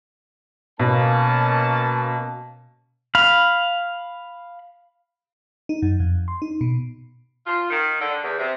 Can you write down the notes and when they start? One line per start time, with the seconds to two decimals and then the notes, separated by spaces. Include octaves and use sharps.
0.79 B2 A#3 C#4 A5
3.15 F5 B5
5.69 D#4
5.82 F#2
6.00 F2
6.28 C6
6.42 D#4
6.61 B2
7.47 F4
7.70 D#3
8.01 D3
8.24 E2
8.39 C3